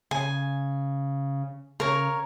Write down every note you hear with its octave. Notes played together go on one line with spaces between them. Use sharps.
C#3 G#5
C#3 A#4 C#5